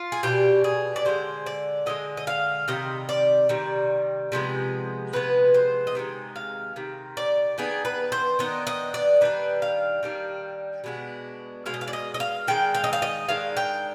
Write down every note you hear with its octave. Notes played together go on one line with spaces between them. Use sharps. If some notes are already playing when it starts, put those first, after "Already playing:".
Already playing: F4
G#4
B2 G3 D4 G4
G#4
D5
D3 F3 G#3 C5
D5
D3 F3 G#3 D#5
D#5
F5
C3 D#3 G3 D#5
D5
C3 D#3 G3
C3 F3 G#3 B3
C3 F3 G#3 B3 B4
C5
D#5
C3 D#3 G#3
F5
C3 D#3
D5
D#3 B3 D4 G#4
B4
C5
D#3 B3 D4 D#5
D#5
D5
D#3 G3 D4 B4
F5
D#3 G3 D4
B2 G#3 B3 D4
B2 G#3 F5
D#5
F5
D5
D#5
D#5
F5
D#3 G#3 D4 G5
F5
D#5
F5
D#5
D#3 G#3 D4 F5
G5